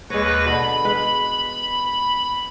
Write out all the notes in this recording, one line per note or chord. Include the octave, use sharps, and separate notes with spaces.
D#2 G#3 B4 C#5 A#6
B2 D3 B5
G#3 B4 F5